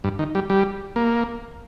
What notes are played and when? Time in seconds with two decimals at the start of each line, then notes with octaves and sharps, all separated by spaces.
0.04 G2
0.19 D#3
0.35 G3
0.50 G3
0.96 A#3